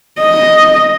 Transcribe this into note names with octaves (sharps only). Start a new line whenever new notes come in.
D#5